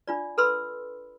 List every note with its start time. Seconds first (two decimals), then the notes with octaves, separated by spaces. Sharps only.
0.08 D4 F4 D5
0.38 A4 B4 B5 C6 E6